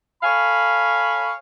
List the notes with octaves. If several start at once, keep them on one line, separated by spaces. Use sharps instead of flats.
A4 C#5 F5 G#5 B5